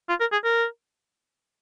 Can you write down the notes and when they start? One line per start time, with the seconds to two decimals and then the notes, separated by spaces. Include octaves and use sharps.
0.09 F4
0.21 A#4
0.32 G#4
0.45 A#4